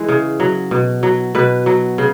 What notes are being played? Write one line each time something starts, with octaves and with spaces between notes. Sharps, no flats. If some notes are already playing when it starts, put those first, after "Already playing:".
Already playing: E3 G#3
C#3
F#3
B2
F#3
B2 B4
F#3
C#3